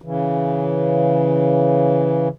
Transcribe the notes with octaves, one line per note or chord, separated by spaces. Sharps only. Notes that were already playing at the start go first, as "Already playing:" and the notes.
C#3 E3